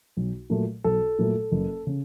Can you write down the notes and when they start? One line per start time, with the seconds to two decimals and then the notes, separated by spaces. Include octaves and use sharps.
0.17 B1
0.50 A#2 F#3 A3
0.84 B1 A4
1.19 A#2 F#3 A3
1.51 F#1
1.87 C#3